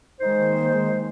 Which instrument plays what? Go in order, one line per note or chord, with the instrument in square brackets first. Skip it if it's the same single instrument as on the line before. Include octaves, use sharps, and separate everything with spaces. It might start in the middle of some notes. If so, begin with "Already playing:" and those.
[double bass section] D#3 G#3 A#3 [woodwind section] D#4 C5